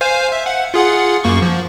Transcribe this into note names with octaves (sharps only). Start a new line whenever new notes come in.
C5 F5 G#5
E5
F#5
F4 G#4 F#5
F#2 A#3 C#6
F3